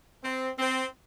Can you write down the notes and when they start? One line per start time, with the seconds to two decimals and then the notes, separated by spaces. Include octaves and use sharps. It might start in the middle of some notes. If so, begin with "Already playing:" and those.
0.23 C4
0.59 C4